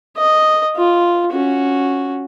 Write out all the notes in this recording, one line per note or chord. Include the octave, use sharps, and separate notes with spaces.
D#5
F4
C#4 F#4